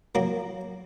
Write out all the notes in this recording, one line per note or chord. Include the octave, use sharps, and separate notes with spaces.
F#3 A#3